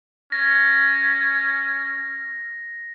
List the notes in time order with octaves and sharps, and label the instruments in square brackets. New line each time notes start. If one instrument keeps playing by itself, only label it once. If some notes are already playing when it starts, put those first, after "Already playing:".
[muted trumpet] C#4 [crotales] A#6